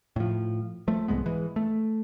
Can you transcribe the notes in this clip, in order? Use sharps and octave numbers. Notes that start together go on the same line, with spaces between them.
A2 F3
F3 A3
C2 G#2 G#3 B3
E3 G#3
A3